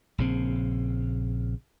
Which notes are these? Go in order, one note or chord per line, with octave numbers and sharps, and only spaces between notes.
A#1 C#3 C4